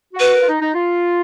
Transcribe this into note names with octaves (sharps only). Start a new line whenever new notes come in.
F#4
B4
A#4
F4
D#4
D#4
F4